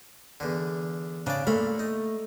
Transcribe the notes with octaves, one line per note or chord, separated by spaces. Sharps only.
E2 D3
C#3 D4 D5
A#2 A3 F5 B5
D#4